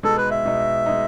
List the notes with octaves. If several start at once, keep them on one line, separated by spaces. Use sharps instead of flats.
B2 G#3 D#4 A4
B4
E5
B2 G#3 D#4
B2 G#3 D#4